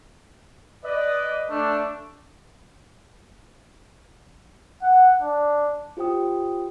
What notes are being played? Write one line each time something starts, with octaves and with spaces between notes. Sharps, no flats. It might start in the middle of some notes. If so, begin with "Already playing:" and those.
B4 D5 D#5
A3 D4
F#5
D4
F4 G4 C5 G5 D#6